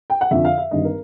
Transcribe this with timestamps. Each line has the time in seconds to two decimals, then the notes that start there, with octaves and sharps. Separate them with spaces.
0.10 G5
0.21 F#5
0.31 F2 D3 F3 E5
0.45 F5
0.58 E5
0.71 G#1 G2 D#3 D#5
0.85 A#4